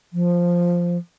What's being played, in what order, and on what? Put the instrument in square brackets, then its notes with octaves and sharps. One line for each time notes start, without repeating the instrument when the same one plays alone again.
[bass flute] F3